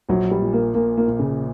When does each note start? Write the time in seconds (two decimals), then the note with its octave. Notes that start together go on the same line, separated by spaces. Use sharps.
0.09 A#1 F#3
0.31 G3
0.42 A#2
0.53 A#3
0.74 A#2 A#3
0.97 A#3
1.08 A#2
1.19 C#3